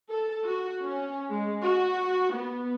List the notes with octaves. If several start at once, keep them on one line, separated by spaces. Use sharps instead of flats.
A4
F#4
C#4
G#3
F#4
B3